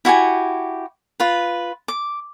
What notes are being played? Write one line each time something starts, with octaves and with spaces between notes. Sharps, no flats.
E4 F#4 G4 G#5
F4 B4
D6